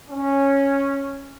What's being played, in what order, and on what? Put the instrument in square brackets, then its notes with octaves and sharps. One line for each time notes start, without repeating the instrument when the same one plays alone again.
[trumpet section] C#4